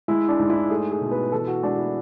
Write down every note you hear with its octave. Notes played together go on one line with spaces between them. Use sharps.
G#3 E4
D4
G#2
E4
A3 G#4
G#4
B2
B4
E3 A4
F#4
G#3 D4
E4